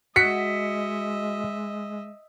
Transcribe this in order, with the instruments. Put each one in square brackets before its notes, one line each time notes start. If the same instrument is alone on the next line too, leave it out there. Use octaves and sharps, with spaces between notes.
[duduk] G#3 [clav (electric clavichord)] F#4 [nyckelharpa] D#5 E5 [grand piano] B6 C#7